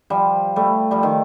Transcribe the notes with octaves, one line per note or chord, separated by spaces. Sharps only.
F3 G3
G3 A3
F3 G3
D#3